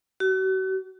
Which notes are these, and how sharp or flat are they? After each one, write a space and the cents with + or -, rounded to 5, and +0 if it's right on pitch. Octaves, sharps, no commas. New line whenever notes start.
F#4 +40